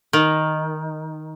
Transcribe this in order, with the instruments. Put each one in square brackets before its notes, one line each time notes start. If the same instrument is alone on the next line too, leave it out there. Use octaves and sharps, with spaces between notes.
[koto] D#3